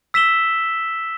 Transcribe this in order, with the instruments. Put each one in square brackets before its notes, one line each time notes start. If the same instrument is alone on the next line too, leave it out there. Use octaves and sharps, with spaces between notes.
[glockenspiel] E6 B6 E7 G7